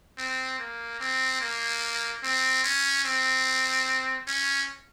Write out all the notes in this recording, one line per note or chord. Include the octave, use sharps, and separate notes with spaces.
C4
A#3
C4
A#3
C4
C#4
C4
C#4